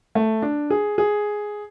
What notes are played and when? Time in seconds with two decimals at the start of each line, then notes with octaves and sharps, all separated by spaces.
0.15 A3
0.42 D4
0.70 G#4
0.98 G#4